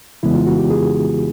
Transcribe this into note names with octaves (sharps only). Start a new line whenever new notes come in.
F2 C#3 E3 G#3 B3 E4
F4
F#4
G4
G#4